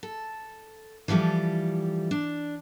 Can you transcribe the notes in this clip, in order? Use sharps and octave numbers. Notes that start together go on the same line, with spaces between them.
A4
E3 F3 G3 G4 A4
D4